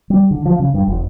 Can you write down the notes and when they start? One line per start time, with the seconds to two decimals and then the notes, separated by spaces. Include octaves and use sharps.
0.10 G3
0.31 D3
0.45 F3
0.59 C#3
0.74 G2
0.87 F1